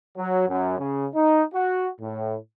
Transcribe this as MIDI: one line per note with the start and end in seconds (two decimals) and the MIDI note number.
0.17 0.45 54
0.48 0.76 42
0.78 1.07 49
1.14 1.43 63
1.54 1.88 66
2.01 2.35 45